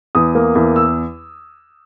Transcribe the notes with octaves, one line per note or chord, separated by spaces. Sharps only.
E2 D#6
A#3
E2
E6